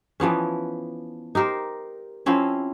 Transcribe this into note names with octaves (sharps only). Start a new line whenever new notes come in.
E3 F3 B3 C#4
D#4 G4 A#4 C5
F3 C4 C#4 E4